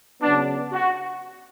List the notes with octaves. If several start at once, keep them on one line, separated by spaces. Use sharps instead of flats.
C#3 F#3 B3 D4
F#4